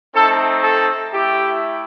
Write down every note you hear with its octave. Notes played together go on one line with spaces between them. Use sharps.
A3 C4 D#4 A4
A4
A3 E4 G4